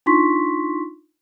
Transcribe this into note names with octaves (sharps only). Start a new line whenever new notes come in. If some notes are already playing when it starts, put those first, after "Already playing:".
D4 D#4 F4 C6 C#6 B6